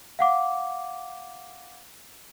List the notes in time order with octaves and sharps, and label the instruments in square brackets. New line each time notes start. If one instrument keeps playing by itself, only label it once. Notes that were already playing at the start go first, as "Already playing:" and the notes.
[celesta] F5 F#5 D6